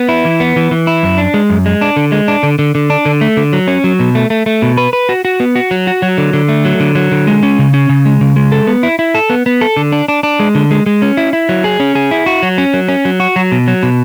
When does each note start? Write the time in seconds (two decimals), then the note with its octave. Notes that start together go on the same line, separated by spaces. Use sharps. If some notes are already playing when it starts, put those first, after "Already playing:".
Already playing: B3
0.09 E4
0.25 E3
0.40 B3
0.56 E3
0.71 E3
0.87 E4
1.03 F#2
1.18 D4
1.34 G#3
1.50 F#2
1.66 G#3
1.81 D4
1.96 D3
2.12 G#3
2.28 D4
2.43 D3
2.59 D3
2.75 D3
2.90 D4
3.05 D3
3.21 A3
3.37 D3
3.53 F#3
3.68 C#4
3.84 F#3
4.00 B2
4.15 A3
4.30 A3
4.46 A3
4.62 B2
4.77 B4
4.93 B4
5.09 F#4
5.25 F#4
5.40 B3
5.56 F#4
5.71 F#3
5.87 F#4
6.02 F#3
6.18 D3
6.33 D3
6.49 A3
6.65 F#3
6.80 D3
6.95 F#3
7.12 D3
7.27 G#3
7.43 C#4
7.59 C#3
7.74 C#4
7.89 C#3
8.05 G#3
8.21 C#3
8.36 G#3
8.52 A4
8.67 B3
8.83 E4
8.99 E4
9.15 A4
9.30 B3
9.46 B3
9.61 A4
9.77 D3
9.92 D4
10.08 D4
10.23 D4
10.40 G#3
10.55 D3
10.71 G#3
10.86 G#3
11.02 C#4
11.17 E4
11.33 E4
11.49 F#3
11.64 G#4
11.80 C#4
11.95 G#4
12.11 E4
12.26 F#4
12.43 F#3
12.58 C#4
12.74 F#3
12.88 C#4
13.05 F#3
13.20 F#4
13.36 F#3
13.52 B2
13.68 F#3
13.83 B2